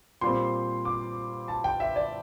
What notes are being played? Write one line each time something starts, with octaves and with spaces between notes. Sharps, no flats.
A#2 G3 C4 C6
D6
A5
G5
E5
D5